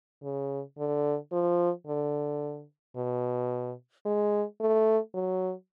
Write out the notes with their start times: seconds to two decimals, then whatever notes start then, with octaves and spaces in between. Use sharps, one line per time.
0.23 C#3
0.78 D3
1.32 F3
1.87 D3
2.96 B2
4.06 G#3
4.60 A3
5.14 F#3